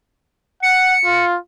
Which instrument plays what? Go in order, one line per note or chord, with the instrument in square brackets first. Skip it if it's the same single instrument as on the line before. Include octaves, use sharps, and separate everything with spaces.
[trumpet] F#5 [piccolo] C#7
[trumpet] F4